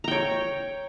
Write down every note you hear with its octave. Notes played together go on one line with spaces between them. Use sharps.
C#5 G5 A#5